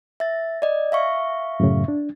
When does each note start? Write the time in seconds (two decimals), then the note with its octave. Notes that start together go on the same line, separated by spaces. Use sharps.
0.20 E5 A6
0.62 D5 D#5
0.92 E5 F5 C#6
1.60 F#2 A2 C#3
1.88 D4